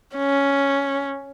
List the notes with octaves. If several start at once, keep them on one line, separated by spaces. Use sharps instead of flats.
C#4